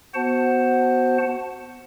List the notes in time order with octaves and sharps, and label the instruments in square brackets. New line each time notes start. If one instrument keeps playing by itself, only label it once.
[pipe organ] B3 F#4 C5 F#5 A5